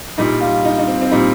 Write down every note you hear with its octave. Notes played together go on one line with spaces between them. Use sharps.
C2 A#2 G3 D#4
F4
D#4
D#4
C4
C4
A#2 G3 D#4